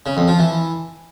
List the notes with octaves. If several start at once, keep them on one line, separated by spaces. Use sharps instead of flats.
C#3
F2
F3
E3